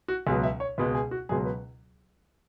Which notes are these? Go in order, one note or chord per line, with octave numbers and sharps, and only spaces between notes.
F#4
C#2 B2 F#3 G#4
E5
C#5
C#2 B2 G#3 B4
G#4
F#4
C#2 B2 F#3 G#4
B4